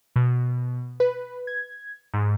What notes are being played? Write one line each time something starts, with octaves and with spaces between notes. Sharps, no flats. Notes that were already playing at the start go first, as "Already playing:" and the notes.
B2
B4
G#6
G#2